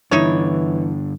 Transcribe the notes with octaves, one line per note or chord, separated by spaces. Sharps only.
G2 D3 E3 D#4 E4 C#5